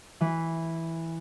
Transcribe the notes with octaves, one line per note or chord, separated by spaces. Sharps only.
E3